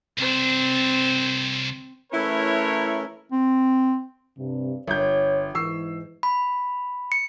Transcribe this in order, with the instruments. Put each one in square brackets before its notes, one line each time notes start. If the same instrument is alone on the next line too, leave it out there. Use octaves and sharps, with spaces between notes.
[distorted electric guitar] C2 D4 [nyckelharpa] C4 C5
[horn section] E3 A3 C#4 E4 A#4 C#5
[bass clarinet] C4
[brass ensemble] G2 C3
[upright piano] G1 G6 [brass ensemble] C#5
[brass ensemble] G#2 E3 [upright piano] C#6 E6 C7
[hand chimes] B5
C#7